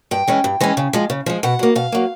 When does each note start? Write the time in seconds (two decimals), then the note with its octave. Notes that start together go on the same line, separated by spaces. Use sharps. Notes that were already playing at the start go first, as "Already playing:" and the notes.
0.11 G2 G5
0.28 E3 G#3 C#4
0.44 G2
0.61 E3 G#3 C#4
0.77 C#3
0.93 F3 G#3
1.10 C#3
1.26 F3 G#3
1.43 B2 F#5
1.59 F#3 A#3
1.75 B2 F5
1.92 F#3 A#3